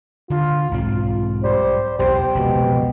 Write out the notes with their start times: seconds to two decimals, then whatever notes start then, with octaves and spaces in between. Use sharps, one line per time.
0.30 D3 F4
0.71 B1 G#2 C4 F4
1.43 G3 C5
1.99 B1 E2 G4 C5
2.35 F1 C#2 B2 B3